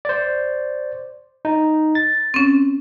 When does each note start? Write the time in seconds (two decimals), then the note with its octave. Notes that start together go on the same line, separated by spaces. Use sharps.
0.05 C5 D5
1.45 D#4
1.95 A6
2.34 C4 C#4